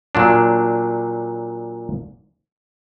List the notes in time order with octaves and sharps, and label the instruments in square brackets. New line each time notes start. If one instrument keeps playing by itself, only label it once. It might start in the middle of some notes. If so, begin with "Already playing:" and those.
[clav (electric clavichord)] A#2 F#3 D4